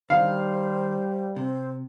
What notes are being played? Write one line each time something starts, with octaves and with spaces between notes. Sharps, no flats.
D#3 G3 C5 F5
C3 C4